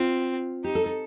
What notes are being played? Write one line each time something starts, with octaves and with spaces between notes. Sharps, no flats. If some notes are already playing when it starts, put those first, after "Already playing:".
Already playing: C4 F4
D#4 G4
A4
A4